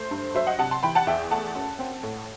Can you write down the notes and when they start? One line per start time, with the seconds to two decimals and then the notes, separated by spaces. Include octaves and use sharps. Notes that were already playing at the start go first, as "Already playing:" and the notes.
Already playing: A3 C5
0.11 G2
0.35 F#3 C5 E5
0.47 D#5 F#5
0.59 C3 F#5 A5
0.71 A5 C6
0.83 E3 G5 B5
0.95 F#5 A5
1.07 E2 E5 G5
1.31 A3 F#5 A5
1.55 F#2
1.79 C4
2.03 A2